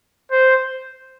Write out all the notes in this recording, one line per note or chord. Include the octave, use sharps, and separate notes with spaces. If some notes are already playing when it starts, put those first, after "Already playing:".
C5